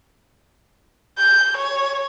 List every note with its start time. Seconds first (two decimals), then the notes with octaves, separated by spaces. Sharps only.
1.18 G6
1.57 C#5